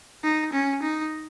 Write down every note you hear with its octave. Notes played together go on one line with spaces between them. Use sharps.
D#4
C#4
D#4